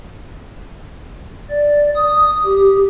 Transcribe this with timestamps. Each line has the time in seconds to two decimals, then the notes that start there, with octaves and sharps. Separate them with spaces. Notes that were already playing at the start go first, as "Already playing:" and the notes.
1.50 D5
1.95 D#6
2.45 G4